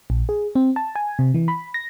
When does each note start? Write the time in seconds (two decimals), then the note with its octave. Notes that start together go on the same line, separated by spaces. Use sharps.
0.10 A#1
0.29 G#4
0.55 C4
0.76 A5
0.95 G#5
1.19 C3
1.34 E3
1.48 B5
1.74 A#6